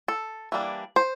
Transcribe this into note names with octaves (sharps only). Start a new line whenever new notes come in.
A4
E3 G3 A#3 D4
C5